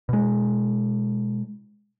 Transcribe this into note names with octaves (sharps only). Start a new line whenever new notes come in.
B2 G#3